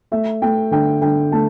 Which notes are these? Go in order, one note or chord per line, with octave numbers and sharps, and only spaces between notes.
A3 E5
A3 G5
D3 G5
D3 G5
A3 A5